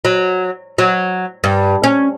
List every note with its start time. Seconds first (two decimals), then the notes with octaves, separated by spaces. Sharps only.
0.05 F#3
0.78 F#3
1.44 G2
1.84 C#4